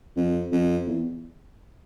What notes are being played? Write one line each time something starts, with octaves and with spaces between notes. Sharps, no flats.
F2
F2
E2